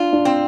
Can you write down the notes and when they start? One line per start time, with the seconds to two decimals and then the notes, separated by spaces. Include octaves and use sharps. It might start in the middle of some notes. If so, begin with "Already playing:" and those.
Already playing: D4 F4
0.13 D4
0.25 C4